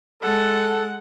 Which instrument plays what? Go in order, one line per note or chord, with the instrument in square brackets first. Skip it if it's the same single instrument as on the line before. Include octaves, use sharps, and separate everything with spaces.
[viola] G#3 F#5 [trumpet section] A4